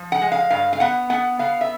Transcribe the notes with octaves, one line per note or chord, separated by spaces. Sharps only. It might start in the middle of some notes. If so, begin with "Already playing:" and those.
Already playing: F3
F#5
G#3
F5
G2 F5
F5
B3 F#5
B3 F#5
B3 F5
E5